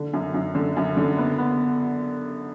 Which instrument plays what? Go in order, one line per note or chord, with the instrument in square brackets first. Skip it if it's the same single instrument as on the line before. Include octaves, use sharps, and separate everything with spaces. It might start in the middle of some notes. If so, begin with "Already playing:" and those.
Already playing: [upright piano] D3
F#2
F#2
D3
F#2
D3
B3
B3